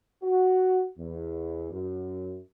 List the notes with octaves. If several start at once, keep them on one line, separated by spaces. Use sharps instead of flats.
F#4
E2
F#2